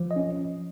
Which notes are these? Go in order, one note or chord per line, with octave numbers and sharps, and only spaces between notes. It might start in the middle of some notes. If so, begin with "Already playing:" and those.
Already playing: F3
D#5
C#4